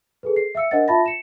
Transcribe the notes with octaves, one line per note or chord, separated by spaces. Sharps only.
G#4 A4 B4
C7
E5 F5 E6 C#7
D4 A#4 C5 D#5 F#5 A6
F4 E5 A5 B5 A6 A#6
C#7 E7